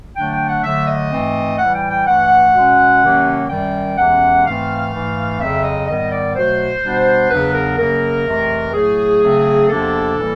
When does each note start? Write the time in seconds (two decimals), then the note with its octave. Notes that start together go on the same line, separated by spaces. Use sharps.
0.16 D3 F#3 A3 D4 G5
0.32 G5
0.47 F#5
0.63 D3 F#3 A3 E5
0.88 D#5
1.11 G#2 E3 A3 C4
1.59 A2 E3 G3 F#5
1.75 G5
1.91 G5
2.07 G2 E3 A3 F#5
2.54 B2 G#3 C#4
3.02 C3 D#3 F#3 A#3 C#4
3.49 F#2 D#3 G3 G5
3.97 E2 C3 E3 G#3 C#4 F#5
4.45 G#2 E3 A3 C4 F5
4.92 G#2 E3 A3
5.40 F2 C#3 F#3 E5
5.64 D#5
5.87 G#2 D#3 G3 B3 D#5
6.12 D5
6.36 B2 F#3 A3 C5
6.83 B2 G3 B3 D4
7.31 E2 C#3 F#3 B3 D4 B4
7.54 A#4
7.78 F#2 C#3 F#3 A#3 A#4
8.26 F2 C3 E3 A3
8.74 A2 F#3 A3 G#4
9.21 C#3 F#3 A3 C4
9.69 E2 C3 F3 A#3 D4 A4
10.17 A2 E3 G3 A#3